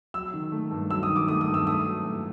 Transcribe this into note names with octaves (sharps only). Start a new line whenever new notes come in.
F#3 E6
D#3
A3
G2
F#3 E6
D#6
D#3
D6
A3 D#6
D#6
G2
E6
A3 D#6
F#3
A2